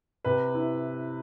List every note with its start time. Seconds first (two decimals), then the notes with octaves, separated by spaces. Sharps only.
0.25 C3 B4
0.54 E4